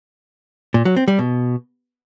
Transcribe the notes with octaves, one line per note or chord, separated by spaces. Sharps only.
A#2
F#3
C4
G3
B2